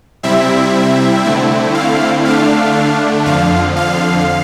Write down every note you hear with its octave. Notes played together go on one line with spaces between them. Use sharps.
C3 G3 C4 E4 E5
D3 A3 C4 E4
F5
D3 A3 D4 F5
F2 D3 F3 F5
F5